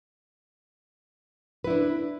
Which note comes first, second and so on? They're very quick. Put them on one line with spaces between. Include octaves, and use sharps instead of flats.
B4 E4 D4